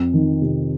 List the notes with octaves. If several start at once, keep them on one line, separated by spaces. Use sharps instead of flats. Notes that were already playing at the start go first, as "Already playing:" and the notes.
Already playing: F2
D#3
C3